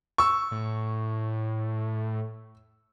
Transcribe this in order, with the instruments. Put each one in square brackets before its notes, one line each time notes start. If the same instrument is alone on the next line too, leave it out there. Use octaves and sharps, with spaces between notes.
[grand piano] C#6 E6
[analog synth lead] A2